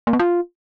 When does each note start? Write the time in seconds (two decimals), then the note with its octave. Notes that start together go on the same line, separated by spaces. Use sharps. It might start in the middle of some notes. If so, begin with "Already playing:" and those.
0.07 A#3
0.13 B3
0.19 F4